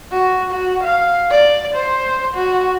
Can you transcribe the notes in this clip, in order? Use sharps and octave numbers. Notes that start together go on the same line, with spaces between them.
F#4
F#4
F5
D5
C5
F#4